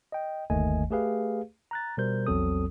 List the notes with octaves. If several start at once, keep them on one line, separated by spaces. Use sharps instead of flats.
D#5 G5
G1 D#2 D#3 A3 D#5 G#5
A3 G4 G#4 B4 F5
A#5 F#6 A6
B2 G3 A#4 C5 G6
A#1 E2 F#3 C4 A4 D#6